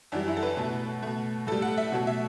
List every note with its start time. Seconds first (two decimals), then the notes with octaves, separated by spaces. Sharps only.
0.12 F#2 E3 G3 D4
0.28 E4
0.37 A4
0.43 B4
0.57 B2 A3
1.02 B2 A3
1.47 A2 G3 A4
1.62 F#5
1.78 E5
1.92 B2 F#3 A3
2.07 E5